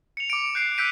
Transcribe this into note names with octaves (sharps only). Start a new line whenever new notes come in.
C#7 F7
D6 D7
F#6 G6 C7 D7
E6 F#6 G6 B6 D7 D#7